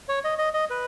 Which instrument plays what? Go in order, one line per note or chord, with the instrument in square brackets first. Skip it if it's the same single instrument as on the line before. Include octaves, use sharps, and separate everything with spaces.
[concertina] C#5
D#5
D#5
D#5
B4